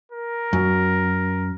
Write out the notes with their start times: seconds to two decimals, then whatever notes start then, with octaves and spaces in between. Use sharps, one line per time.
0.12 A#4
0.53 F#2